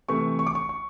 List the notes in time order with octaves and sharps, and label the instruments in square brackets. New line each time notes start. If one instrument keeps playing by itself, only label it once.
[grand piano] C3 E3 A3 C#6
C#6
D6
C#6
C#6